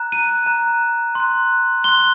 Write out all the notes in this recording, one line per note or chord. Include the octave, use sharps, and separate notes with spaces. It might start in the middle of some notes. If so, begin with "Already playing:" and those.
Already playing: A#5 F#6
D#7
A#5 F#6
C6 F#6
C6 F#6 G7